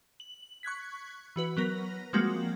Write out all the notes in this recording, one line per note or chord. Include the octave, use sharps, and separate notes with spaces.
F#7
C#6 F#6 G#6 B6
E3 F#4 B4
F#3 B3 A#4 A#6
F3 G3 G#3 A#3 C4 F#4